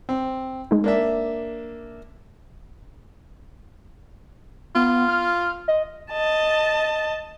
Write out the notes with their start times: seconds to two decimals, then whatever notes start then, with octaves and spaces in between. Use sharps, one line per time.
0.09 C4
0.71 G#3 D#4
0.84 A#3 D4 E5
4.75 B3 F4
5.08 F6
5.68 D#5
6.11 D#5 A5